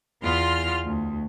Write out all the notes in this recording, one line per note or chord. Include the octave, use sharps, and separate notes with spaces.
E2 B3 F4 C6 F6
D2